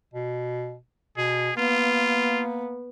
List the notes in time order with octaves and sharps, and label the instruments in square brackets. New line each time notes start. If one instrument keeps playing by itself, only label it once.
[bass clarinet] B2
[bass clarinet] B2 [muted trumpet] G#4
[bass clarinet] A#3 [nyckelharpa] B3 [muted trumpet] F4